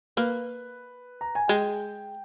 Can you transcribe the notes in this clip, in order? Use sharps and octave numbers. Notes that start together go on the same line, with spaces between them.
A#3 B4
A#5
G#5
G#3 G5